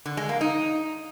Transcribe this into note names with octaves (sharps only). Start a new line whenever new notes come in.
D3
G#3
A#3
D#4